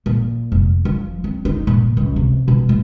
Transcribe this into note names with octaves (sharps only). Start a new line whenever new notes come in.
A#2
F1
F3
C4
D#4
A#2
C#2
C3
B2
A1